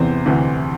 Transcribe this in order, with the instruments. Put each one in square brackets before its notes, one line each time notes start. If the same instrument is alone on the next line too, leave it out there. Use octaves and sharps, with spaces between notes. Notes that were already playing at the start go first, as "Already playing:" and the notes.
Already playing: [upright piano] E2 C3 E3 C5
D2 C3 E3